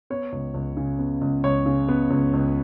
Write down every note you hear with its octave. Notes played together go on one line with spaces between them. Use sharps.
B3 C#5
C#2
C#2
C#3
B3
C#2
C#2 C#5
C#3
B3
C#2
C#2